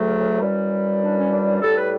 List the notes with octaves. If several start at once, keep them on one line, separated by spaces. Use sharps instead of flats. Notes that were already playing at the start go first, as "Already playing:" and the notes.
Already playing: D2 C#3 F#3 A3
F#2 E3 G3
D4
C#4
D4
D4
A2 G3 A4
B4